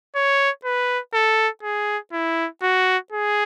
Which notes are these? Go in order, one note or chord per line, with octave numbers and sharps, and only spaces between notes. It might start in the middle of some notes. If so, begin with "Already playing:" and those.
C#5
B4
A4
G#4
E4
F#4
G#4